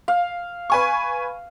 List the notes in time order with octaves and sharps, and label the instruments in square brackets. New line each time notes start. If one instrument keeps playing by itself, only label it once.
[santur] F5
[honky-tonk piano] B4 G#5 C#6